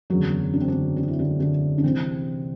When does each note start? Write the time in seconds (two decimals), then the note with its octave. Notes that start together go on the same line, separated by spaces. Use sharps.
0.10 F#1 E2 D3 F#3 F#4
0.54 D4
0.61 C4
0.68 D3 D4
0.96 D4
1.08 E4
1.19 D3 D4
1.40 D3 D4
1.78 D4
1.84 C2 C3 E3 C4